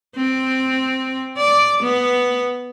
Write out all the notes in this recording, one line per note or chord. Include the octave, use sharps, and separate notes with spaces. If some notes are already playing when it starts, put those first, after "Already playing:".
C4
D5
B3